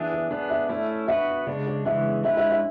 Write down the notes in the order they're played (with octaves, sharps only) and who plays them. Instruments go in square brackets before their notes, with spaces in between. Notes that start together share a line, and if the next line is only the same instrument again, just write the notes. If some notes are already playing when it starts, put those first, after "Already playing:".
Already playing: [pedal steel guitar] E3 B3 D4 G#4 [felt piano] E5
[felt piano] D5
[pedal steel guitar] B3 D4 G#4 [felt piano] D5
[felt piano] E5
[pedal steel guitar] A3 C#4 E4 [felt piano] D5
[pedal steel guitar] B3 F#4 B4 [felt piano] E5
[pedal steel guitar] C#3 G#3 D4 [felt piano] D5
[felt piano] D5
[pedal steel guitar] C#3 E3 G#3 B3 [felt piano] E5
[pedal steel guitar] G#3 C#4 E4 B4 [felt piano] E5
[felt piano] E5
E5